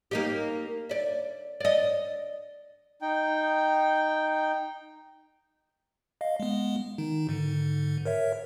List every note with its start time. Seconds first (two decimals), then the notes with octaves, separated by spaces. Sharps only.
0.11 A#3 D#4 G4
0.89 D5 E5
1.60 D5 D#5
3.02 D#4 G5
6.21 D#5 F5
6.40 G#3 B3
6.98 D#3 D#4
7.29 G#2 D3
8.05 A#4 C#5 E5